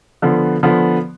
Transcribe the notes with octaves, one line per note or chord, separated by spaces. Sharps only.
D3 F3 B3
D3 F3 B3